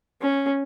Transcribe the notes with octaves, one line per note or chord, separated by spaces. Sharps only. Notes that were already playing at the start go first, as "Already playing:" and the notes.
C#4